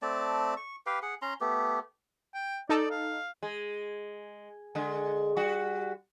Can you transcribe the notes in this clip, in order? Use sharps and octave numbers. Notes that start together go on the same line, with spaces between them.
A3 C4 D5 A5
C#6
G4 B4 F5 G5
G#4 F#5
C#4 A#5 C6
A3 B3 G4
G5
D#4 A4 D5
F5
G#3
D3 G#3
G3 F#4